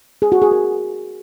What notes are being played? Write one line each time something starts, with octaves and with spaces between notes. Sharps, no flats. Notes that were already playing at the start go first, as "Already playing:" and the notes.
G#4
F#4
G#4
A#4